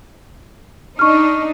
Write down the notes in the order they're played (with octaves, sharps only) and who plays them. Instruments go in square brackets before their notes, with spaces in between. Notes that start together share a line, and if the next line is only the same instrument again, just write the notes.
[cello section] D4 D#4 [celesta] C#6 F6